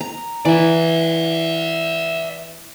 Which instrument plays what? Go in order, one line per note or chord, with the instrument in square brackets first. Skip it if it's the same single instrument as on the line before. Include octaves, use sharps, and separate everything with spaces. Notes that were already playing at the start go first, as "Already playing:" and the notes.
[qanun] A#5
[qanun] E3 [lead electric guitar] D5 E5